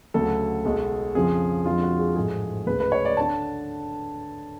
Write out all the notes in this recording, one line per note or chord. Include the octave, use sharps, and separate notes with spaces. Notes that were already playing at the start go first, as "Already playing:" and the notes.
D2 C#3 F#3 A4
B1 B2 G#3
F2 C#3 F3 G#4
F2 D3 F3 G#3 F4
F#4
G#4
A1 G#2 F3 A3 G#4
D2 C#3 G#3 B4
B4
C#5
D5
D3 A5